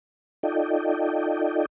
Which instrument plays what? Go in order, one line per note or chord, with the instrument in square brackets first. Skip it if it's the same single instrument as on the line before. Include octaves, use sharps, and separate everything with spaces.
[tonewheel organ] D#4 F4 A4 D5 D#5 G5